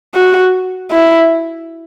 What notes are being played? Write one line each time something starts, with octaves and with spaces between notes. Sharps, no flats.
F#4
E4